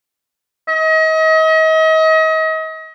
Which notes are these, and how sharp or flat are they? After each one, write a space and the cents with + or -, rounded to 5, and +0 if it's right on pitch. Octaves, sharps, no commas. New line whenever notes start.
D#5 +35